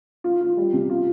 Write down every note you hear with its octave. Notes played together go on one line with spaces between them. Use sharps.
F4
F4
G3
C3
F4